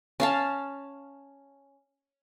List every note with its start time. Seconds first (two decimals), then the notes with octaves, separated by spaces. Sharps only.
0.20 C#4 F5 A5